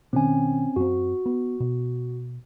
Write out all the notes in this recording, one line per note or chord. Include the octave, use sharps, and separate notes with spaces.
B2 D#3 C4 C#4 G#5
F#2 C4 F#4
B3
B2